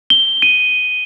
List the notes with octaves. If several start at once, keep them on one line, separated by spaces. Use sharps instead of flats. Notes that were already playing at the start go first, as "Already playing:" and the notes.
G7
D#7